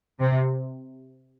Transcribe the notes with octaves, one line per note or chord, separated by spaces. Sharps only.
C3